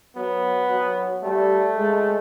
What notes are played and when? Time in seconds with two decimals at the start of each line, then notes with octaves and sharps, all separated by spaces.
0.16 F#3 B3
0.70 F#3
1.23 G3 A3
1.77 G#3